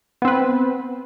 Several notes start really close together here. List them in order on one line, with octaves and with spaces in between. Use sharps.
B3 C4 B4